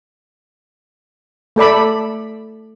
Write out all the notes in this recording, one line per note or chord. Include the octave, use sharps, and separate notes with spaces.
A3 A4 D5 B5